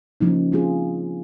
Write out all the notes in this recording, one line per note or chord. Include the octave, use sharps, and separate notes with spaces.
C#3 F3 A#3 D#4
F3 C4 F4 G#4